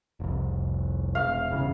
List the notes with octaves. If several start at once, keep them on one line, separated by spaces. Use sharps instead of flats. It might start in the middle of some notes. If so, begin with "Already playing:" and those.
F1 C2
E1 F5
G1 E2 C#3